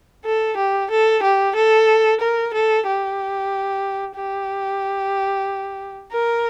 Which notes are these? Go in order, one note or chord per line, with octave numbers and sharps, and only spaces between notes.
A4
G4
A4
G4
A4
A#4
A4
G4
G4
A#4